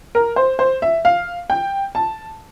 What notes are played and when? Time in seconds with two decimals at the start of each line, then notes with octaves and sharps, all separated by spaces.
0.15 A#4
0.36 C5
0.59 C5
0.82 E5
1.05 F5
1.50 G5
1.95 A5